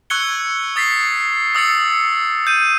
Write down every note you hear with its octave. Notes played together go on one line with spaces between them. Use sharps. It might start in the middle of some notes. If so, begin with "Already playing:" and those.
C#6 E6 F#6 G#6 C#7 G7
D#6 A6 B6 C7
D#6 E6 A6 C#7
G6 D#7